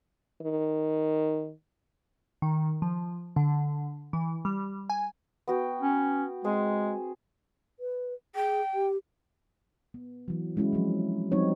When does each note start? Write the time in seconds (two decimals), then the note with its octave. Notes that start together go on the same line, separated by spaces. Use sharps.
0.42 D#3
2.42 D#3
2.82 F3
3.36 D3
4.13 E3
4.45 G3
4.90 G#5
5.48 B3 F#4 G5
5.82 C#4
6.44 G#3 C4 G#4
7.80 B4
8.35 G#4 G5
8.74 G4
9.94 B3
10.28 E3 F#3
10.56 F#3 G#3 C#4 E4 F#4
10.73 F3 F#3 C4
11.32 F3 G3 C4 D#4 F#4 C#5